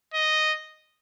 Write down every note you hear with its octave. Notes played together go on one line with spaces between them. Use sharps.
D#5